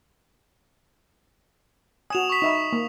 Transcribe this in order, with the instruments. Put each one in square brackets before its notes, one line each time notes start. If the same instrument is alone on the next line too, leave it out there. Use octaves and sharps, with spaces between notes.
[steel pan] F#4 G#5 [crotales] D#6 E7 F7
[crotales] C#6 B6
[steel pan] D#4 E5 B5
A#3